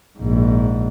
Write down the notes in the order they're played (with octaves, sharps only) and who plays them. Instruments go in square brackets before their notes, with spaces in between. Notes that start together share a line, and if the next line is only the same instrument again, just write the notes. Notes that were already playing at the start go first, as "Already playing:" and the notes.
[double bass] A#1 G#2